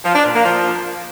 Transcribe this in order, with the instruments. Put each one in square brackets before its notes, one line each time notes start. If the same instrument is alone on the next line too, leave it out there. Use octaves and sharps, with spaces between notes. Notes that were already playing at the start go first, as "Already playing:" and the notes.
[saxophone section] F3
D4
A#2
A#3
F3